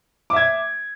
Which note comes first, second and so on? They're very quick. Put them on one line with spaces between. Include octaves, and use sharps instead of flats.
D6 E5 G#6